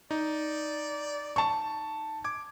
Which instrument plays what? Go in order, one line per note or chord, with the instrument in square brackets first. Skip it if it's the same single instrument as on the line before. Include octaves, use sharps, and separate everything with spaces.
[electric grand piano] D#4 [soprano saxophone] D5
[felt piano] A5 C#6
[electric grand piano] D6 G#6